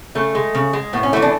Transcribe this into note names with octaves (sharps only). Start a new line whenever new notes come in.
C#3 A3
G#3
C#3
G#3
A2 B3
C#4
E3 A3 E4
D4